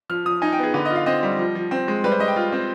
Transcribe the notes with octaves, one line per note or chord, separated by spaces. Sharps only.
F3 F6
F3 D#6
D#4 G#5
G5
B3
G#4
D3 B4
F4 D#5
F5
C4 D#5
G3
F3
F3
C4
G#3
G3 B4
C5
G3 D#5
G5
F4
C4